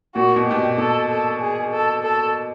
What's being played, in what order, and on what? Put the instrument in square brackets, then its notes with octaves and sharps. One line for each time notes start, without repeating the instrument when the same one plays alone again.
[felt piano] A#2 [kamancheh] F#4
[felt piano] B2
[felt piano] B2 [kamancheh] G4
[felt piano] A#2
[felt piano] B2 [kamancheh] A4
[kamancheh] A4
G#4
A4
A4